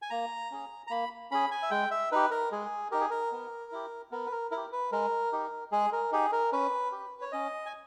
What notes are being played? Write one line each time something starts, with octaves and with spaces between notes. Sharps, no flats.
G#5
A#3 A#5
C#4 G#4
A#5
A#3 B5
C#4 G#4 B5
G#5
E5
G#3 G5
E5
D#4 G4 B4
A#4
G#3 G#4
D#4 G4 A#4
G#4
A#4
B3
E4 G4
B3 A#4
B4
A#4
E4 A#4
G4
B4
G#3 A#4
D#4 G4
G#3 G#4
A#4
D#4 G4 G#4
A#4
C#4 B4
G4
C#5
C#4 D#5
G#5